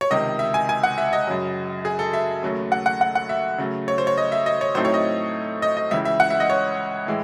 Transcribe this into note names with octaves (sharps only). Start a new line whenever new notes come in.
C#5
C#2 C3 D#3 D#5
E5
G#5
G#5
F#5
E5
D#5
F#2 C#3 F#3
G#4
A4
E5
D#2 C#3 F#3 A3
F#5
F#5
F#5
F#5
E5
C#3 F#3 A3
C#5
C5
C#5
D#5
E5
D#5
C#5
A2 F#3 A3 C4 D#4 C5
C#5
D#5
D#5
D#5
C#2 C#3 E3 E5
E5
F#5
E5
D#5
C#5
A2 E3 G#3